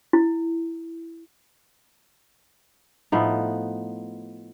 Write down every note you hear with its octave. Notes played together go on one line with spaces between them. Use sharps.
E4
A2 F3 B3 D#4